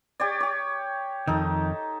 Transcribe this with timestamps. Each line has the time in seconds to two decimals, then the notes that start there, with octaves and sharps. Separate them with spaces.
0.20 G4 C#5 D5
0.40 G4 C#5
1.27 F2 D#3 D#4 A4